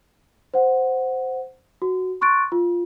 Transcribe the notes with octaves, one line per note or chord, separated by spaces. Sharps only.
C5 F#5
F#4
C6 C#6 F#6 A6 D7
F4